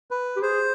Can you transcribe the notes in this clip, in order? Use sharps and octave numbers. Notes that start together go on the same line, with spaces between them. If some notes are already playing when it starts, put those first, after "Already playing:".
B4
G4
G#4 C5